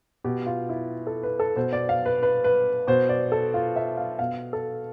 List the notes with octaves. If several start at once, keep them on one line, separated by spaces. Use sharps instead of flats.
B2 G4
F4
E4
A4
B4
A4
B2 C5
D5
F5
B4
B4
B4
B2 C5
D5
A4
F4
E5
F5
B2 F5
A4